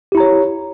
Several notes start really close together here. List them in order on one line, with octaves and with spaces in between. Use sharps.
G4 E4 A#5 C#5